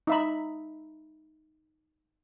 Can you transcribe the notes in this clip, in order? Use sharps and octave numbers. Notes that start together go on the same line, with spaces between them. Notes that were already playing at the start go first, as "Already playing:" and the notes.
D#4 E5 B5